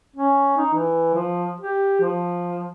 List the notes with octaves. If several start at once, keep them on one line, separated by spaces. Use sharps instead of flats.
C#4
D#4
E3
F3
G4
F3